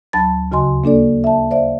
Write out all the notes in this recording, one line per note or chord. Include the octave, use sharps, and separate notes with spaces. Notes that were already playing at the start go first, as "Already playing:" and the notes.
D2 F#3 A5 B5 A6
D#2 C#3 F#4 D#5 G#5 C6
A#3 D4 A4 D5
E5 A5
C5 D5 E5 F5